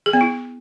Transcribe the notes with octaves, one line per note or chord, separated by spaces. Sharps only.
G#4
B3
E4